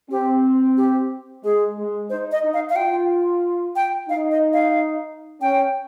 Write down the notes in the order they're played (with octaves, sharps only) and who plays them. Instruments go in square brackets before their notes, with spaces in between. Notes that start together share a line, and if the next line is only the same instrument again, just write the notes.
[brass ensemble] C4 [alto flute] G4
[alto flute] G4
[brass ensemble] G#3 [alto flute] G#4
[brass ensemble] G#3
[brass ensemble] D#4 [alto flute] C5
[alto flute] D#5
[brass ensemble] D#4
[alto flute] F5
F5
[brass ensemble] F4 [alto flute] G5
[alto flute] G5
[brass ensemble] D#4 [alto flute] F5
[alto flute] D#5
F5
[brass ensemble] C#4 [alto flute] G5